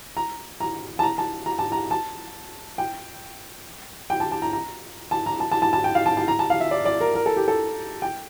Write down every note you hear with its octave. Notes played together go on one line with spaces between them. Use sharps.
A#5
A#5
A5
A#5
A5
A#5
A5
A#5
A5
G5
G5
A5
A5
A#5
A#5
A5
A#5
A5
A5
A5
A5
G5
F5
A5
A5
A#5
A5
F5
E5
D5
D5
A#4
A#4
A4
G4
A4
G5